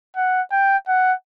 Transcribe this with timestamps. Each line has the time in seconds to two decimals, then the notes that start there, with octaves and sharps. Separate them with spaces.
0.16 F#5
0.52 G5
0.88 F#5